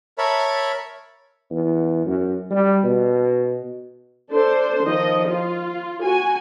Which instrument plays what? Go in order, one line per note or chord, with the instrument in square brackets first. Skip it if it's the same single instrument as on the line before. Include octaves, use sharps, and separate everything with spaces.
[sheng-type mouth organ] A#4 C#5 E5 A5 B5
[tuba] E2
F#2
G3
B2
[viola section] D4 A4 C5
D#3 F3 D#5
F4
F#4 G#5